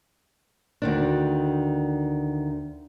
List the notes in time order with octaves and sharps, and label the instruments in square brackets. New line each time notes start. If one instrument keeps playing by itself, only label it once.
[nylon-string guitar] D2 D#3 D4